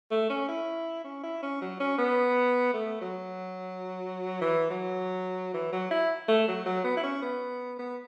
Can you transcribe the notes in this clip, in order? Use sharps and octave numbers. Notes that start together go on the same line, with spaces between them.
A3
C#4
E4
C#4
E4
C#4
F#3
C#4
B3
A3
F#3
E3
F#3
E3
F#3
E4
A3
F#3
F#3
B3
E4
C#4
B3
B3